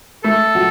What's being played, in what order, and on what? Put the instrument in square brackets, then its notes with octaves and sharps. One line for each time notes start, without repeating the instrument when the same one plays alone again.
[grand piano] A3 [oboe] A4
[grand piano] F#3